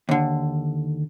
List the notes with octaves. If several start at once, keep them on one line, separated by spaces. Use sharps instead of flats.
D#2 D3